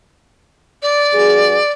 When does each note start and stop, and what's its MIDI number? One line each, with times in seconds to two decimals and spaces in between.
0.83 1.71 74
1.14 1.57 43
1.14 1.57 66
1.14 1.57 68